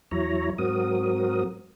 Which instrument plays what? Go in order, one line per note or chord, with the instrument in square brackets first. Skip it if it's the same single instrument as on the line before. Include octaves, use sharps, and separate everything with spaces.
[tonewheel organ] E2 F#3 E4 C#5 A#5
G#2 F#3 C4 F#4 A#4 D#6